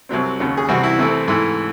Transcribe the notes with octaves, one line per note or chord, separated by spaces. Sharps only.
C2 C3 F#3 C4
D#2 C#3 F#3
G#4
C2 C3 E3 C4 F#4
E4
C2 C3 E3 A3 C4
G#2 E3 A3 E4